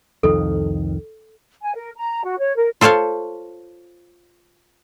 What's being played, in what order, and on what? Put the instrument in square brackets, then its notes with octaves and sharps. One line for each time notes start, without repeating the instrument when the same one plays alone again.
[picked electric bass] C2 F2 D#3 [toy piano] A4
[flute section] G#5
A#4
A#5
F#4
C#5
A#4
[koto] F4 A4 C5 C#5 F5